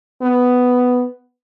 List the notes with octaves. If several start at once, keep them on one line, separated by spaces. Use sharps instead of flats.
B3